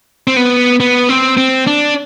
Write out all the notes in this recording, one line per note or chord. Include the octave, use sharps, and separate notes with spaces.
C4
B3
B3
C4
C4
D4